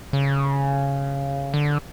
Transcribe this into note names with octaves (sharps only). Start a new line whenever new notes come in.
C#3
D3